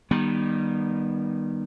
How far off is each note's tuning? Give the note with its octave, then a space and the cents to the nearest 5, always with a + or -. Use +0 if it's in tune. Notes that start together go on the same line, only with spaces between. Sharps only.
D#3 -20 G3 +0 B3 -25